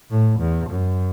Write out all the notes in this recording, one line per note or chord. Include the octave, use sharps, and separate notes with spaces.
A2
E2
F#2